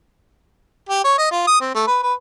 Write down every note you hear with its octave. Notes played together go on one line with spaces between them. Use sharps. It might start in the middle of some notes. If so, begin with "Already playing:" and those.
G4
C#5
D#5
F4
D#6
C4
A3
B4
B4